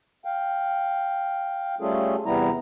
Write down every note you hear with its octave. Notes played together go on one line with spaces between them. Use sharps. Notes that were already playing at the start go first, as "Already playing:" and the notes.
F5 G5
G3 A3 C#4 F4 G#4 A4
E2 C3 G3 B3 E4 A#5